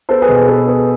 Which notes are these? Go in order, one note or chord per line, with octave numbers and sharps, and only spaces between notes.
B3 A4 C5
G#4 B4
B2
G#4
B3 A4
B3 G#4